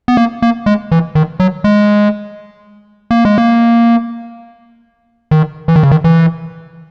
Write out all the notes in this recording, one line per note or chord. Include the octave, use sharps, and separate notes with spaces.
B3
A#3
A#3
G#3
E3
D#3
F#3
G#3
A#3
G#3
A#3
D#3
E3
D#3
C#3
D#3
E3